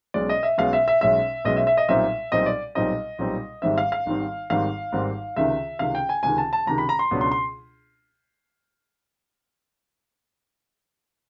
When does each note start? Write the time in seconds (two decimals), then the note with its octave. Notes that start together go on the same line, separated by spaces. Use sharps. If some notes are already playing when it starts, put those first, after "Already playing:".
0.14 B1 B2 G#3 C#4 D5
0.29 D#5
0.43 E5
0.58 B1 B2 G#3 C#4 F5
0.73 E5
0.88 E5
1.01 B1 B2 G#3 C#4 E5
1.44 B1 B2 G#3 C#4 D#5
1.56 E5
1.67 E5
1.77 D#5
1.89 B1 A#2 G3 C4 D#4 E5
2.32 B1 A#2 G3 C4 D#4 D#5
2.46 D5
2.75 B1 A#2 G3 C4 D#4 D#5
3.19 B1 A#2 G3 C4 D#4
3.62 G#1 G#2 D#3 G3 C4 E5
3.78 F5
3.92 F5
4.06 G#1 G#2 D#3 G3 C4
4.50 G#1 G#2 D#3 G3 C4 F5
4.92 G#1 G#2 D#3 G3 C4
5.36 C#2 C3 D#3 E5
5.79 C#2 C3 D#3 F5
5.95 G5
6.09 G#5
6.23 C#2 C3 D#3 G#5
6.38 A5
6.53 A5
6.66 C#2 C3 D#3 A#5
6.78 B5
6.89 A#5
6.99 C6
7.11 C#2 B2 F#3 B3 D4
7.21 C6
7.32 C6